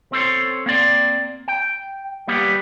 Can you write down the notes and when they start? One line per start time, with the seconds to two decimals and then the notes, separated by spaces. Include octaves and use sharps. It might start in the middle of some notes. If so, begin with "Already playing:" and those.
0.12 C4 A4 C5 C#5
0.66 A#3 C4 D5 C6
1.48 G5
2.28 G3 A#3 B3 G4